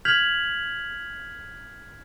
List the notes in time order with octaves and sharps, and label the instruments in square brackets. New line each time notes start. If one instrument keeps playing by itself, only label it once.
[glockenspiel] F6 G6 G#6 B6 F7 F#7